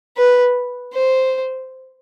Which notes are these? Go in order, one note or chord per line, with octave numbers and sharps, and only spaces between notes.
B4
C5